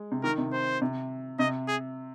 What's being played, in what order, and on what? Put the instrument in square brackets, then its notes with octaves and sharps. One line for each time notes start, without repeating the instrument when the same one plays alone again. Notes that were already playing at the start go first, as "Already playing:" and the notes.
Already playing: [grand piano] G#3
C3
[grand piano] D#3 [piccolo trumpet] A#4
[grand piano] C3
[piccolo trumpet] C5
[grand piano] C3
[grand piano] C3 [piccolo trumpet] D#5
[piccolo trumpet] G#4